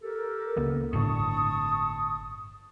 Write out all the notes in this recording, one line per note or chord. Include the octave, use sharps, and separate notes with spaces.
G4 A4 A#4
C#2 A#3 B3
G1 A2 D3 A5 C#6 D#6